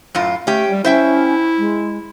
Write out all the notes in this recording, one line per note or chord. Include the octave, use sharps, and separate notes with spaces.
F#2 A2 F4
A3 C#4 G4
G3
C#4 E4 C5 E5 G5
G#3